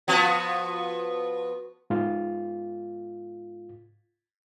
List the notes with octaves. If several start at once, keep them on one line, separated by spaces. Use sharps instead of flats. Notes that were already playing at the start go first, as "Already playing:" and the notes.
F3 B3 F#4
G#2 F4